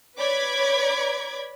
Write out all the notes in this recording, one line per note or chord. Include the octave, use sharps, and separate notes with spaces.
B4 C#5 D5 B5 D6 G#6